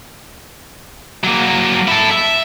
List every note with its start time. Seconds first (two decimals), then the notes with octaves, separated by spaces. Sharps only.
1.24 F#3 A#3
1.88 E4 A4
2.11 E5